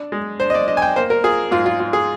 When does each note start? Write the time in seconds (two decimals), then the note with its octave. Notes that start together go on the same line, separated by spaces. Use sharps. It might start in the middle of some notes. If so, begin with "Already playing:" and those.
Already playing: D4
0.12 G#3
0.40 D4 C5
0.50 D#5
0.54 D5
0.68 D4 D#5
0.77 G#5
0.82 G5
0.96 A#3 C5
1.10 A#4
1.24 F4 G#4
1.51 G#2 F4
1.66 F4
1.80 F4
1.93 G#4